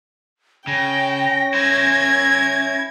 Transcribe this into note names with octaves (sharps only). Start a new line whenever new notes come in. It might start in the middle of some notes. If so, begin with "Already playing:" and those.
C#3 C#4 G5 A#6
E4 C5 G#6